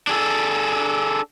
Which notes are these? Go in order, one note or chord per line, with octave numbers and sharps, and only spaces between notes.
D4 G#4 A4